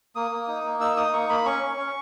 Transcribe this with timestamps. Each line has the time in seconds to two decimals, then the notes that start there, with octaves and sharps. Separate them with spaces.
0.15 A#3 D#6
0.31 A#3
0.48 D#4
0.64 A#3
0.80 D#4 E6
0.97 D#4 D#6
1.13 A#3 C#6
1.29 A#3 B5
1.46 C#4 C#6
1.62 C#4
1.78 C#4